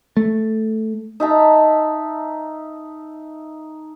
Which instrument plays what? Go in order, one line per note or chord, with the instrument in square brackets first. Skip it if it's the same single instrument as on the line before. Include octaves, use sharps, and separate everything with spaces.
[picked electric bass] A3
[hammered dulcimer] D#4 E5 A5 A#5